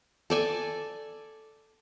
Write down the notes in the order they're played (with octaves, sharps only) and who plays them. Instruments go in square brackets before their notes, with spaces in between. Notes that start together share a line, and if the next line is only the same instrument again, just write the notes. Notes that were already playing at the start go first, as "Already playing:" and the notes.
[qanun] A4 D5 G#5